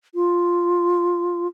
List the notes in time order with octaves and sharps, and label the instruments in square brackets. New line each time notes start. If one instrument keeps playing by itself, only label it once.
[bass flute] F4